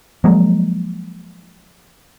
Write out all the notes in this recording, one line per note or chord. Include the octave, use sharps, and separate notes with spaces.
F3 F#3 G#3 A#3